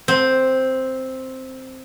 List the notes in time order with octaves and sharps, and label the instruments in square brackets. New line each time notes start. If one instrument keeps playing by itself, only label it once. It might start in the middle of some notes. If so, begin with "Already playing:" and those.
[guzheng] C4